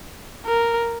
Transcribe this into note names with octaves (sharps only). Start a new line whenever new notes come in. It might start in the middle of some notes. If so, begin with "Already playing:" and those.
A#4